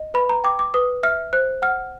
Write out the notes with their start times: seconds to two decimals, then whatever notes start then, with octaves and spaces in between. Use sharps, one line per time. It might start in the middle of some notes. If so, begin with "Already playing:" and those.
Already playing: D#5
0.14 B4 B5
0.29 A#5
0.44 G5 D6
0.59 D6
0.74 B4 D#6
1.03 E5 F6
1.33 C5 F#6
1.62 F#5 F6